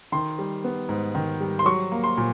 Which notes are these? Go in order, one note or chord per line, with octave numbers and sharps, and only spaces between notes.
D#3 C6
G3
B3
G#2
D#3
G3
C6
F#3 C#6
A#3
C6
A#2